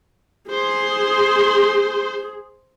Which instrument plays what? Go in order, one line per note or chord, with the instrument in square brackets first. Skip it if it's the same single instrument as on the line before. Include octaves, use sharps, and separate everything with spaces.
[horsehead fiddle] G#4 [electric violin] C5 C6